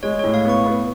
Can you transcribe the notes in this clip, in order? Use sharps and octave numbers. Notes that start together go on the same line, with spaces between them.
G#3 C#5
A2 C#5
F5
B3 C#6
B3